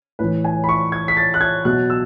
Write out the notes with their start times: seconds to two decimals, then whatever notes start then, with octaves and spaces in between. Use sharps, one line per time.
0.19 A2 E3 B4
0.44 G#5
0.64 B5
0.69 C#6
0.92 G#6
1.08 B6
1.17 A6
1.34 F#6
1.41 G#6
1.65 B2 F#3 F#6
1.90 E6